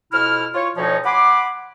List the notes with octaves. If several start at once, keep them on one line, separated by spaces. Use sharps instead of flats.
F2 B2 E4 F6
F4 C#5
D2 B2 F3 D#4 C#5
F#5 G#5 B5 C6 D6